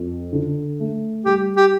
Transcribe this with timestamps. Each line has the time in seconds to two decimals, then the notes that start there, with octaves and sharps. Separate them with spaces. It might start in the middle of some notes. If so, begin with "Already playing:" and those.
Already playing: F2
0.33 D3
0.80 A3
1.25 G3 G4
1.56 G4